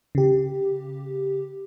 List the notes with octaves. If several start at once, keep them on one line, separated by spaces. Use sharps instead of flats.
C#3 G4